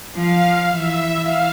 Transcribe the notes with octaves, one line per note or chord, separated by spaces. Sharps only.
F3 F5
E3 E5
F5